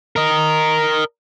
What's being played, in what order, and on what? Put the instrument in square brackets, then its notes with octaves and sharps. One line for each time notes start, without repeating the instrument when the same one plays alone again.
[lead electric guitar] A#4 D#5